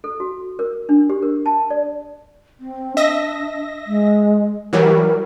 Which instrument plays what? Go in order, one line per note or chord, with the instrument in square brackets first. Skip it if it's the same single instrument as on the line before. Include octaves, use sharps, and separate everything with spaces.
[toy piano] A4
F#4
A#4
D4
G4
A#4
A5
D5
[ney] C4
[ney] D4 [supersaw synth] D#5 E5 A#6
[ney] G#3
[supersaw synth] E3 F#3 G3 [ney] A#4